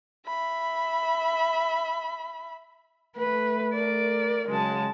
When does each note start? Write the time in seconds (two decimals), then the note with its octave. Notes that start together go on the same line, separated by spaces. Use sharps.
0.27 E5 B5
3.17 A3 B4
3.74 A#4 D5
4.48 C#3 F#3 G#3 A5